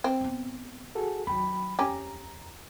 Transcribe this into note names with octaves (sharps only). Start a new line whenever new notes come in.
C4
D1 B3
F#4 G#4 A4
D#2 F#3 G5 B5
F2 C#4 G4 A#5